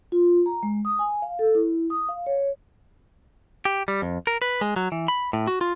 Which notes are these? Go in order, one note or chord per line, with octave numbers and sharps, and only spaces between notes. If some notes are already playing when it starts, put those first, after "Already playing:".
F4
A#5
G#3
D#6
G#5
F5
A4
E4
D#6
F5
C#5
G4
G3
F2
A#4
B4
G#3
F#3
E3
B5
A2
F#4
F4